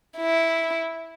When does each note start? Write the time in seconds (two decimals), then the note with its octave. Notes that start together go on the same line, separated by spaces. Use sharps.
0.18 E4